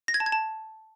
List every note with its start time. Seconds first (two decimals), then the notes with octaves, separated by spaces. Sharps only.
0.08 A#6
0.14 G#6
0.20 A5
0.26 G#6
0.32 A5